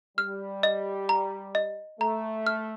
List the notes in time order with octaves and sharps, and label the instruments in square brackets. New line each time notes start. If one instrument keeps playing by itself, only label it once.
[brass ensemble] G3 [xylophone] F6
[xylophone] D#5
A#5
D#5
[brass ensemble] A3 [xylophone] A#5
[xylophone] F6